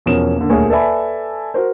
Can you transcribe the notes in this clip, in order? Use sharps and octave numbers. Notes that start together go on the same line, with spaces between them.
E2 B2 F3 C#4 A#4 E7
D3 A#3
D#1 D2 G#4 A#4 C#5 G#5
A4 B4 D5 E5 G#5 B5
F#4 A#4 C5